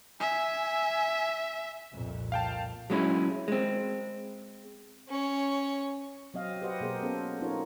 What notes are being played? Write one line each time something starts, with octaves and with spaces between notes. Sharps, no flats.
E5 G#5
C2 F2 A#2
F5 G5 A5
F#3 G#3 C#4 E4
G#3 C4
C#4 C#5
F#3 C4 D#5 F5
G4 B4 C5 D#5 F#5
B2 A#3 G#4 A#4 C5
B3 C#4 A4 C5
C4 C#4 D#4 F4 A#4 C#5